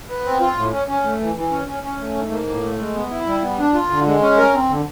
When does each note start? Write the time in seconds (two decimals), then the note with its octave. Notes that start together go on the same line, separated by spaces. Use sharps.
0.09 B3
0.25 C4
0.40 F4
0.57 A2
0.72 C#4
0.88 C#4
1.04 A3
1.20 E3
1.36 E3
1.52 C#4
1.68 C#4
1.83 C#4
1.99 A3
2.15 G#2
2.31 A#3
2.47 A2
2.63 A3
2.79 G#3
2.95 B3
3.10 E4
3.26 G3
3.42 B3
3.58 D4
3.74 F4
3.90 D3
4.06 G#3
4.22 C#4
4.37 A#4
4.53 C4
4.69 D3